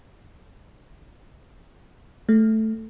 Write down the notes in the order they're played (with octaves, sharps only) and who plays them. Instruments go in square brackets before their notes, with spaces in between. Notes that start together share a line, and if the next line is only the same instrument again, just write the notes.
[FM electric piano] A3